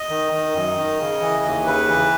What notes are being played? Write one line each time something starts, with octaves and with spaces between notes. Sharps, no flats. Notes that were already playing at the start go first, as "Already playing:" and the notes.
Already playing: D#5
D#3
D#3
F#2
D#3
C#3
E3
D#2
C#3 B4
E3